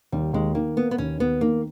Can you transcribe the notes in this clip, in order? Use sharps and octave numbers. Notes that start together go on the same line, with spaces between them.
D#2 G3
D#2 G#3
D#3 A#3
A#3 B3
B3
D#2 C#4
D#2 B3
D#3 A#3